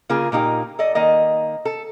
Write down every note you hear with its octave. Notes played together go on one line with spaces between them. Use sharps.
C#3 A#3 F4 G#4
A#2 A#3 D#4 G4
A4 D5 D#5
D#3 A#3 D#5
A4